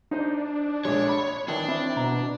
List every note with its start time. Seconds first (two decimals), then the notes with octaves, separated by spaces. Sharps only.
0.11 D4 D#4 C5 D#5
0.85 A#1 G#3 C#5
1.09 B5
1.48 D#3 E3 D4
1.68 C4 E4
1.97 B2 A#5